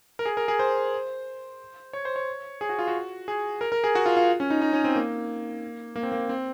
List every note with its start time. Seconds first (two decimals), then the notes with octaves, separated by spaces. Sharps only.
0.19 A#4
0.25 G#4
0.37 A#4
0.48 G#4
0.59 C5
1.93 C#5
2.05 C5
2.16 C#5
2.61 G#4
2.69 F#4
2.79 F4
2.88 F#4
3.28 G#4
3.61 A#4
3.72 A#4
3.84 G#4
3.95 F#4
4.06 F4
4.16 F4
4.40 C#4
4.50 D#4
4.62 D#4
4.73 C#4
4.84 C4
4.96 A#3
5.96 A#3
6.03 C4
6.12 A#3
6.29 C4